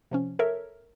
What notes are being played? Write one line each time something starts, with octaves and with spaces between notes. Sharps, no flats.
C3 F3 C#4
A4 A#4 C#5 E5